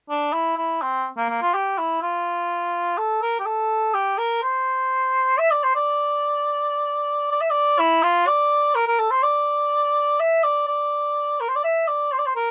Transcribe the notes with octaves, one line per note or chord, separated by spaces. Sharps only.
D4
E4
E4
C4
A#3
A#3
F4
G4
E4
F4
A4
A#4
G4
A4
G4
A#4
C5
E5
D5
C5
D5
D5
E5
D5
E4
F4
D5
A#4
A#4
A4
C5
D5
E5
D5
D5
A#4
C5
D5
E5
D5
C5
D5
C5
A#4